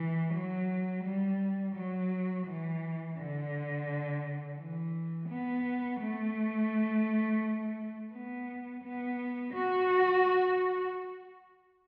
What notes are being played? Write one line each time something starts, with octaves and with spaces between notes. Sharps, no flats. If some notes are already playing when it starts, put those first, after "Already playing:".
Already playing: E3
F#3
G3
F#3
E3
D3
E3
B3
A3
B3
B3
F#4